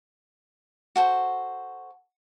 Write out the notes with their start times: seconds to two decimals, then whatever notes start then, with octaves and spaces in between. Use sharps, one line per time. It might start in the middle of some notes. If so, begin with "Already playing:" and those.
0.96 F#4 A4 C5